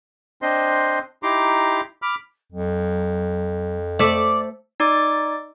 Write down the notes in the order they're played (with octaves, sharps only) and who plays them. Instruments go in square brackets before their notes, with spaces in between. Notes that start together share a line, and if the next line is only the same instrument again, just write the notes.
[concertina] C4 D4 C5 D#5 C6
D#4 E4 G4 A#5 C6 D6
B5 D6 F6
[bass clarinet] F2 [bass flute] F#3
[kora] A3 E5 [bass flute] C5 [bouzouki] D5
[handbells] D#4 D5 D6